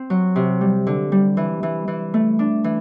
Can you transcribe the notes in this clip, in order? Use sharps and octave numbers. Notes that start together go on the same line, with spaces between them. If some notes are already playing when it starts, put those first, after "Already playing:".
Already playing: C4
F#3
C3
G3
D3
G3
E3
E3
E3
A3
D4
E3